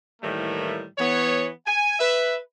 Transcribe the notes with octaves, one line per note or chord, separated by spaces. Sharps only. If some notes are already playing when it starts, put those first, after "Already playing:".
A2 D#3 E3 G3 A3 A#3
E3 B3 C#5
G#5
B4 E5